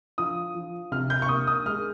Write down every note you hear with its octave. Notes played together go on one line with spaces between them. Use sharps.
F3 D#6
F3
C3 F6
G6
C#6
A#3 D#6
D#6
G#3 F6